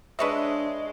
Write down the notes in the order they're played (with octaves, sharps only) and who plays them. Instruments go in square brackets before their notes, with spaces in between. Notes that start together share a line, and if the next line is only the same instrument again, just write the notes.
[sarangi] G#3 [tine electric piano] D4 D#5 [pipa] B4 C#5 E5